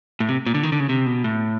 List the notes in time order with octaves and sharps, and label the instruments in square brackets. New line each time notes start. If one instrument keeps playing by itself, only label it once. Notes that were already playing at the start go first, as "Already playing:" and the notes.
[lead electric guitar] A2
C3
A#2
D3
D#3
D3
C#3
C3
B2
A2